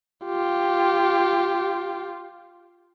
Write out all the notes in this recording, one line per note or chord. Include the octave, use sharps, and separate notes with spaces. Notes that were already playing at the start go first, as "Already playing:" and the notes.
F4 G4